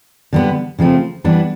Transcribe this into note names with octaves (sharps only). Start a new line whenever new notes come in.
D3 G3 B3
C#3 F3 A3 C4
E3 G3 B3 D4